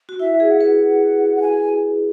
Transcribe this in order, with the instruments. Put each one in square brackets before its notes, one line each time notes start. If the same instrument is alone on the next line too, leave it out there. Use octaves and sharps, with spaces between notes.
[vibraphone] F#4
[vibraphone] E4 [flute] E5
[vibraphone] G#4
[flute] F#5
[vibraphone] B4
[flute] F#5
G#5